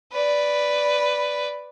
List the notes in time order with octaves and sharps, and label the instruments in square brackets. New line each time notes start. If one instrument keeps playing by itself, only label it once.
[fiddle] B4 D5